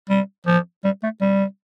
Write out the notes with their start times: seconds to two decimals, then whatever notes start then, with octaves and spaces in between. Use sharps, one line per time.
0.09 G3
0.46 F3
0.84 G3
1.03 A3
1.21 G3